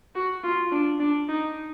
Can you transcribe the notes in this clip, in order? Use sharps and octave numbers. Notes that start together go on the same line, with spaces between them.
F#4
F4
D4
D4
D#4